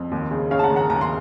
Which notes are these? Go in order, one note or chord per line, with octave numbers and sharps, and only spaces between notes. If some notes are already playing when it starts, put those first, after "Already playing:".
Already playing: F2
D#2
C#3
C#3 C#5 F5
A5
F#5 A#5
D#2
F#5 A#5
D#2 A#5
C6